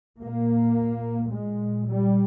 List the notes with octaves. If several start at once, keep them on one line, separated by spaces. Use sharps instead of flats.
A#2 A#3
A#2 G#3
G3